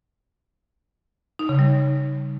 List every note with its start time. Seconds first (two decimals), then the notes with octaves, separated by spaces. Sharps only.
1.39 D#4
1.49 C#3
1.59 G3